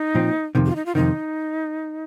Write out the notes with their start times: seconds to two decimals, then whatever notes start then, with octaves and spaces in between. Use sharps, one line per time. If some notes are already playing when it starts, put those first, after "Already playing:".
Already playing: D#4
0.15 A#2 F3 C4
0.55 F2 C3 D#3
0.66 G4
0.70 F4
0.76 D#4
0.86 F4
0.95 F2 C3 D#3 D#4